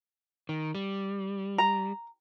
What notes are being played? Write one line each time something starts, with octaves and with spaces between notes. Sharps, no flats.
D#3
G3
A#5